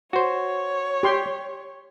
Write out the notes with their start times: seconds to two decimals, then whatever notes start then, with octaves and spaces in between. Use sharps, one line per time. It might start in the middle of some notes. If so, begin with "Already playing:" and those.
0.13 F#4 C5 C#5
1.03 G4 C6